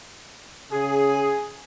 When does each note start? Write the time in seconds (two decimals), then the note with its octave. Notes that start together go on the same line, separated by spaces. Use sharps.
0.72 C#3 G#4